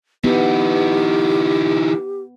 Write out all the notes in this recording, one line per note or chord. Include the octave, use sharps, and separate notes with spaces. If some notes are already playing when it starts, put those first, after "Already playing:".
E3 B3 D#4 G4